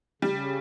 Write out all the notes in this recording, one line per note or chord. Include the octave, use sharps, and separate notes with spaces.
C#3 G3